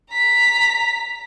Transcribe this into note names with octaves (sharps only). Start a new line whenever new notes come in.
A#5 B6